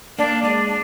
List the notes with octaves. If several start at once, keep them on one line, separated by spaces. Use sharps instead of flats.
A#3 D4
G#3 D4
D4